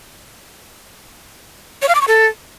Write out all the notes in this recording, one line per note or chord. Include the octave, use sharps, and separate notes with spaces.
C#5
F5
D6
C#6
A4